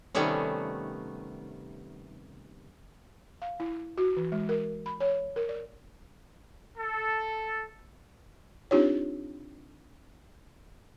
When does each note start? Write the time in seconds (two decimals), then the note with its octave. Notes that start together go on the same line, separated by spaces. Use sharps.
0.15 C3 D#3 G3 A3 B3 C#4
3.42 F5
3.60 E4
3.98 F#4
4.17 E3
4.32 G#3
4.49 A#4
4.86 B5
5.00 C#5
5.36 A#4
5.49 D5
6.78 A4
8.71 C4 D4 D#4 F4 G4 C#5